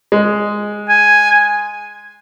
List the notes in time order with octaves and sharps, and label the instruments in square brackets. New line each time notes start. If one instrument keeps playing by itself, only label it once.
[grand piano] G#3
[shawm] G#5